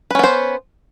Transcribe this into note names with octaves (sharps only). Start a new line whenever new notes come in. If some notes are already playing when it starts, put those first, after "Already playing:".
B3 C#4 B4 C5